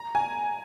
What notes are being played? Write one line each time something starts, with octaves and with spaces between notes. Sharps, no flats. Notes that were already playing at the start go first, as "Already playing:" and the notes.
Already playing: A#5
G#5